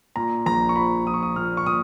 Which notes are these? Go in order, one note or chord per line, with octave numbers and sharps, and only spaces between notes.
A#2 A#5
A#1 A#5
C#6
F3 B5
F3 D#6
C#6
D#6
A#2 F6
C#6
A#2 D#6